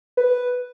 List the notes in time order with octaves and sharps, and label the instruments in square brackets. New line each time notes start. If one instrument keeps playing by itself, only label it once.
[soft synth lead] B4